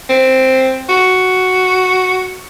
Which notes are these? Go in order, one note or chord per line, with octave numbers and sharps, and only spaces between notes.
C4
F#4